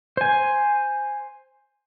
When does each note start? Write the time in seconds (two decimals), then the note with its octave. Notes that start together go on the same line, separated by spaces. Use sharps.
0.17 C5 G#5